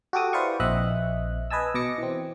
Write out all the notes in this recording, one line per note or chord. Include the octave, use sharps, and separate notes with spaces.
F#4 G4 A4 D6 D#6
E4 B4 C5 D5 F5 C#6
A#1 C4 D#5 E5 F#6
B4 D#5 G#5 A5 E6
B2 D#5 D6 A#6 C#7
E3 C4